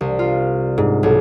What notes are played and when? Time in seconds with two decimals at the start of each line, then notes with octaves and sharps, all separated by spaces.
0.01 C2
0.19 F4
0.78 G#2
1.03 B1